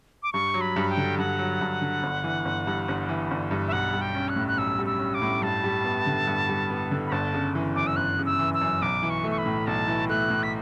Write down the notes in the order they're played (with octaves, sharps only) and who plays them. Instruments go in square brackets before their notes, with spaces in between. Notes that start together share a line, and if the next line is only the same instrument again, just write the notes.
[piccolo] D6
[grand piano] G2 [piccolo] C#6
[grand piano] F#3
[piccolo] B5
[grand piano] G2
[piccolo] G5
[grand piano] D3
[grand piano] G2 [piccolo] F#5
[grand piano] F#3
G2
D3
G1
E3
G1
G2
G1
E3
G1
G2
[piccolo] E5
[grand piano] B1 [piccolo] F#5
[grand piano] G3
[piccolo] G5
[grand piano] C#4
[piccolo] F#6
[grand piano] A2
[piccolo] F#6
[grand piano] B1 [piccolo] E6
[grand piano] G3
[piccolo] E6
[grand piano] C#4
[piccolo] D6
[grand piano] A2
[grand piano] G2 [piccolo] A5
[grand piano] G3
B3
D3
G2
G3
B3
D3
[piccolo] B5
[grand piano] G1 [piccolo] A5
[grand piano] C#3
E3
[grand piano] F#2 [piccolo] D6
[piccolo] E6
[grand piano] G1 [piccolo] F#6
[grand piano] C#3
[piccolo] E6
[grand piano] E3
[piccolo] E6
[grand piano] F#2
[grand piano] B1 [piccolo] D6
[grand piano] E3
[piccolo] C#6
[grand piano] A3
[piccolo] C#6
B5
[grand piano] A2
[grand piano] B1 [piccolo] A5
[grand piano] E3
[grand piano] A3 [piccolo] F#6
[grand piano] A2
[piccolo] B6